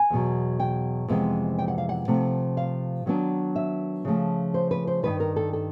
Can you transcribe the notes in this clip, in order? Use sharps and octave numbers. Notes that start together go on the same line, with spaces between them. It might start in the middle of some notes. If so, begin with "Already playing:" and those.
Already playing: G#5
E2 B2 F#3
G5
F2 C3 E3 G#3 B3
G5
F#5
F5
F#5
C3 F3 A3
F5
D#3 F#3 B3 D4
E5
C#3 F3 A3
C5
B4
C5
G2 D#3 G3 B4
A#4
A4
A4